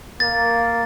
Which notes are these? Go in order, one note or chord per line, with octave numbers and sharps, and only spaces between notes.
A#3 A6